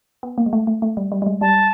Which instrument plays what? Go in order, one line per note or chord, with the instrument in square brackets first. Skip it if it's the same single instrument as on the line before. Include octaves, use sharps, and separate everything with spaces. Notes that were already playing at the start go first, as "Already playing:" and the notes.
[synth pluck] B3
A#3
G#3
A3
A3
A3
G3
G3
G3
G#3
[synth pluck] G3 [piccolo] A5